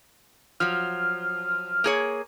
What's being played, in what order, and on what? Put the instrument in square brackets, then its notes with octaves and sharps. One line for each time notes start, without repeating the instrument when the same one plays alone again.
[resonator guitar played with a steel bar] F3 F#3 [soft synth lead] F6
[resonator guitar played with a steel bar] A#3 G#4 C#5